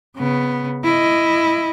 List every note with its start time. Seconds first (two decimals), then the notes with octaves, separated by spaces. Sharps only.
0.16 C#3 B3
0.84 E4 D#5